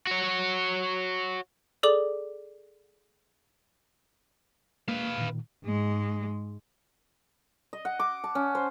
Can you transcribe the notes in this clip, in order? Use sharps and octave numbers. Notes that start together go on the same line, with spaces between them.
F#4 C#5
G#4 A4 D5 D6 F#7
A#3 B4 F5
A#2 D#3
G#2 G#3
D#5
F#5
D6
A5
C#4
C5